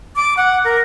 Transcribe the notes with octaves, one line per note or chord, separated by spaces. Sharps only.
D6
F#5
A#4